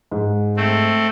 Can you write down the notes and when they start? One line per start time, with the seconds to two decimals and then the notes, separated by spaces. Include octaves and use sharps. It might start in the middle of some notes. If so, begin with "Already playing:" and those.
0.11 G#2
0.57 A3 C4